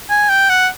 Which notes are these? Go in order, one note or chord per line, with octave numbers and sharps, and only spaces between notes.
G#5
G5
F#5